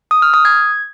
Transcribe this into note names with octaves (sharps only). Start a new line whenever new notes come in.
D#6
F6
D#6
G#6